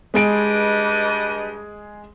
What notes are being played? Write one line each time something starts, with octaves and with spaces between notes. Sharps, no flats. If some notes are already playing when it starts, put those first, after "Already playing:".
G2 G#3 G#4 B4 D#5 D7